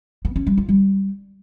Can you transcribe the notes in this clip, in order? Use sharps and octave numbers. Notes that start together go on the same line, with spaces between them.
B3
C#4
G3
F4
G3